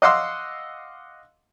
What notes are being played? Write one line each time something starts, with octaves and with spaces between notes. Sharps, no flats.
D#5 F5 F#5 C6 D6 E6